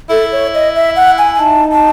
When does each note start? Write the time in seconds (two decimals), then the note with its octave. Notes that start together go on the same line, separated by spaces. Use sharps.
0.10 E4 A4
0.32 C#5
0.54 D#5
0.75 E5
0.96 F#5
1.18 G#5
1.35 G#5
1.39 D#4 A5
1.72 A5